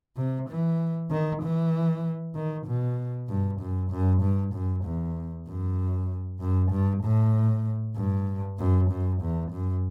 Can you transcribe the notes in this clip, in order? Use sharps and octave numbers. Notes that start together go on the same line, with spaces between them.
C3
E3
D#3
E3
D#3
B2
G2
F#2
F#2
G2
F#2
E2
F#2
F#2
G2
A2
G2
F#2
F#2
E2
F#2